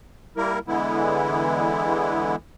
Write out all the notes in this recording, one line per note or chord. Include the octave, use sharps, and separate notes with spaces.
G3 A#3 E4 A#4
D3 E3 G#3 B3 E4